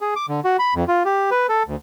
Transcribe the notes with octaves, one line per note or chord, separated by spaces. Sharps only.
G#4
D6
D3
F#4
B5
F2
F4
G4
B4
A4
D2